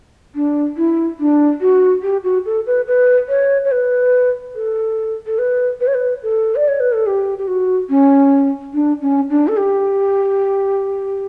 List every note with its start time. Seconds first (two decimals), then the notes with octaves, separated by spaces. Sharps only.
0.35 D4
0.77 E4
1.19 D4
1.61 F#4
2.03 G4
2.24 F#4
2.46 A4
2.66 B4
2.87 B4
3.29 C#5
3.65 C#5
3.71 B4
4.55 A4
5.26 A4
5.38 B4
5.80 B4
5.87 C#5
5.94 B4
6.23 A4
6.56 D5
6.68 C#5
6.80 B4
6.93 A4
7.06 G4
7.38 G4
7.47 F#4
7.89 C#4
8.74 D4
9.01 C#4
9.30 D4
9.48 A4
9.57 G4